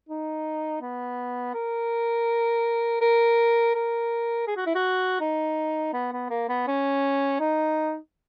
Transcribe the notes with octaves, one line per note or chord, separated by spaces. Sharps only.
D#4
B3
A#4
A#4
A#4
G#4
F#4
E4
F#4
D#4
B3
B3
A#3
B3
C#4
D#4